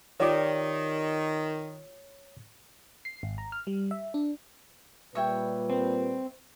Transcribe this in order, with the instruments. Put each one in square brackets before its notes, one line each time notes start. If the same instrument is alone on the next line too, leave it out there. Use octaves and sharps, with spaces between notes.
[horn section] D#3 [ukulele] F4 G4 D5 [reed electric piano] C#5
[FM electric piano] C7
G#1
A#5
F6
G3
E5
D4
[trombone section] A#2 [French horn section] G3 B4 [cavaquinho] C#5 E5 G5
[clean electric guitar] C4